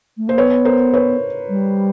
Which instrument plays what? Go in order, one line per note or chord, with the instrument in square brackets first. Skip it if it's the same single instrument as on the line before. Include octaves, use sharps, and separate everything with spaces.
[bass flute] A3
[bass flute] A#3 [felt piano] C5
[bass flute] B3 [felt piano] B4 C#5
[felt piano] A#4 C5
B4 C#5
[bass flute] G3